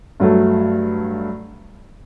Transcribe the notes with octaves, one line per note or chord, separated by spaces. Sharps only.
G2 F#3 A3